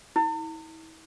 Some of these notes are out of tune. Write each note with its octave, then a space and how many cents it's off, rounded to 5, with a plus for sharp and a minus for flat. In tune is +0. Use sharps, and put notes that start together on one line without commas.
E4 -45